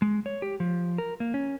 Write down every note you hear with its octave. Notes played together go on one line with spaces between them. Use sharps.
G#3
C#5
G4
F3
A#4
A#3
C#4